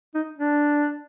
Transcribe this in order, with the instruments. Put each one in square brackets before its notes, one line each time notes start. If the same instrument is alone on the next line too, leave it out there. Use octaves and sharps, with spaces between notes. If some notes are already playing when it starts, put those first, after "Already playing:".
[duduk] D#4
D4